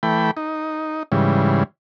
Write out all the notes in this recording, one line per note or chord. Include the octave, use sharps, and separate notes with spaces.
E3 A3 G5 B5
D#4
G#2 C#3 E3 G3